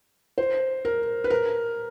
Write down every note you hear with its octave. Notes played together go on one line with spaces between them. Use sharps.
C5
A#4
B4
A#4